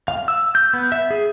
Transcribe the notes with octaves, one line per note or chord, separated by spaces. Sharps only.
F5
E6
G6
B3
E5
G#4